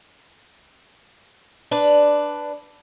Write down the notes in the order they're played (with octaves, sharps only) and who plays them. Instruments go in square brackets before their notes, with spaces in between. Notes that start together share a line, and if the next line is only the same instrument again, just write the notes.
[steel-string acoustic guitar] D4 B4 D5